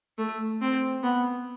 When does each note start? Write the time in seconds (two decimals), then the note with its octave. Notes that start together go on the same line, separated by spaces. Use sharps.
0.18 A3
0.62 C4
1.03 B3